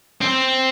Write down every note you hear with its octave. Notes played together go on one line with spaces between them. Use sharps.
C4